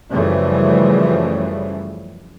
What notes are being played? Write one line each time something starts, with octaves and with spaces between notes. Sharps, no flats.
F#2 C#3 E3 F3 G3 A3